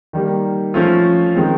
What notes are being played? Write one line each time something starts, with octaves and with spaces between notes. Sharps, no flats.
D#3 G3 A#3
F3 A3 C#4 F4
D#3 G#3 C4